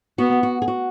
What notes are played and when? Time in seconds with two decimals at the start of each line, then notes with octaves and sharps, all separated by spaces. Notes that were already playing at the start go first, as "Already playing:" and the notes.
0.18 B3 F#4
0.43 F#4
0.62 G#4
0.68 F#4